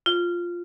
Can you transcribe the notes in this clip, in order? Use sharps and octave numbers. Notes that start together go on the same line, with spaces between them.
F4